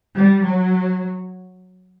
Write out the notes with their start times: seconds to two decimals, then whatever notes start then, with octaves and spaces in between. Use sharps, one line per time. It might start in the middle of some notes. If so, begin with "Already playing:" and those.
0.16 G3
0.45 F#3